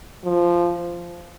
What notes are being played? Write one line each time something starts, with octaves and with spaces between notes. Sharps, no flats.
F3